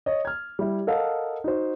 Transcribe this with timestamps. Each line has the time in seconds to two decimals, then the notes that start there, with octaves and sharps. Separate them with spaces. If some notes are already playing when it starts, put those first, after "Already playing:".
0.06 C#5 D#5
0.25 F6 G#6
0.59 G3 E4
0.87 A4 A#4 D#5 F5 F#5
1.44 D#4 F#4 C5